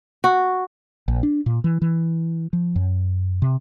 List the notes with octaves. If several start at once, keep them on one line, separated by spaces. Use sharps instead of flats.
F#4
A#1
D4
A#2
E3
E3
F3
F#2
C3